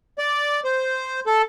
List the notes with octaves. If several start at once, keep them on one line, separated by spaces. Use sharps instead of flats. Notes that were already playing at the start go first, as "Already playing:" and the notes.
D5
C5
A4